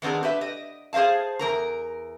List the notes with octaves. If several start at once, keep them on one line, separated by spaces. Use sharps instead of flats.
D#3 B3 C4 D4 G#4
G4 B4 E5
D#5
G#4 C5 D#5 F5 A5
E2 A#4 A#5